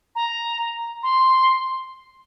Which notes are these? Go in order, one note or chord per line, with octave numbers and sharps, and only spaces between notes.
A#5
C6